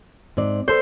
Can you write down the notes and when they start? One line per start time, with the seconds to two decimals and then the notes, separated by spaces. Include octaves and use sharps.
0.37 G#2 C4 D5
0.68 B3 A4 C5